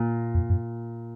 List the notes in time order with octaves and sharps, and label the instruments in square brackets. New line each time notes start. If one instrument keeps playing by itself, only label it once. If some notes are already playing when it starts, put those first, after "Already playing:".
Already playing: [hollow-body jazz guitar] A#2
[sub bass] F2
F#2